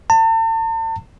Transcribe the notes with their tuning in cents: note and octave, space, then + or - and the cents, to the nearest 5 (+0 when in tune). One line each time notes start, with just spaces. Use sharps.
A5 +40